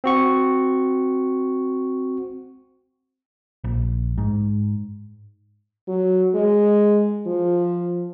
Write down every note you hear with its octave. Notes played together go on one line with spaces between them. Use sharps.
C4 F#4 C#6
A#1
G#2
F#3
G#3
F3